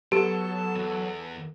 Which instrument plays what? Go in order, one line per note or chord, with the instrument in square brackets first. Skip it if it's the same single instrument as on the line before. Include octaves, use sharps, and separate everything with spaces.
[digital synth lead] F#3 [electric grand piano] B3 A4 [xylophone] G4 [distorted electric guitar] A5
[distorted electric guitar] E2